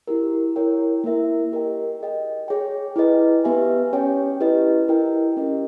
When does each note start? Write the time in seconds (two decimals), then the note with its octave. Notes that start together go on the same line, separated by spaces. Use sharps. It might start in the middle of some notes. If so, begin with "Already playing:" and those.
0.07 E4 G4 A#4
0.56 E4 A#4 C#5 G5
1.04 A#3 E4 A#4 E5
1.52 G4 A#4 D#5 G5
2.01 G#4 D#5 G5
2.48 G#4 C#5 G5
2.96 E4 G#4 B4 D#5 G5
3.44 B3 G4 B4 E5 G#5
3.93 C#4 G4 C#5 G5
4.41 E4 G4 B4 D#5
4.88 E4 A#4 D#5 G5
5.37 C#4 G4 A#4 D#5